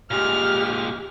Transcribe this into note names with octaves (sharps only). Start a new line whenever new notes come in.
A#2 G#3 G4 F6